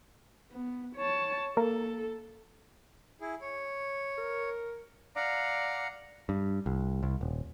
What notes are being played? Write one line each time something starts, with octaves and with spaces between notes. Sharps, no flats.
B3
C#5 A5
A#3 A4
E4 G#4
C#5
A#4
D5 F5 F#5 A#5
G2
C2
C2
D#1